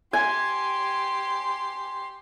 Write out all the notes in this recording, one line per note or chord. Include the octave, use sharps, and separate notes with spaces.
G4 G#5 C6